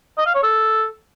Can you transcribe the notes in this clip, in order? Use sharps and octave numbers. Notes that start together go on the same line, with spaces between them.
D#5
F5
C#5
A4